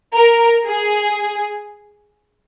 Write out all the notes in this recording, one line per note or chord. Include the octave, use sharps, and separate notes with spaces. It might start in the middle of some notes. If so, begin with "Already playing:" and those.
A#4
G#4